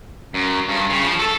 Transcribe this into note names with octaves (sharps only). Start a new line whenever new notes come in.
F#2
G2
C#3
F3
A4